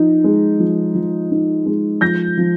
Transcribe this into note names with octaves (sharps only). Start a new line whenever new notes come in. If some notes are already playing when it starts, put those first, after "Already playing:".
Already playing: F3 D#4
G#3
F3
F3
D#4
G#3
F3 G6 A#6
F3